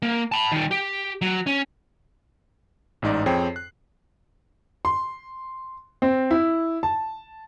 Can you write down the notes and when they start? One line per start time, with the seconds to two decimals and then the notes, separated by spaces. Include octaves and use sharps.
0.02 A#3
0.32 A5 B5
0.52 D#3 G3
0.71 G4
1.22 F#3
1.47 C#4
3.02 A1 G#2 D#4 D5
3.26 F2 C4 G#4 C#5 G5 C7
3.56 F#6
4.85 C6
6.02 C4
6.31 E4
6.83 A5